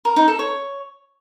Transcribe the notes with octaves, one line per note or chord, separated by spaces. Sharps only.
A#4
D#4
A4
C#5